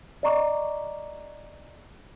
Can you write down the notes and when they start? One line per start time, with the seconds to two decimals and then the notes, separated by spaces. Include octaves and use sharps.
0.23 D5 D#5 A#5 C#6 D6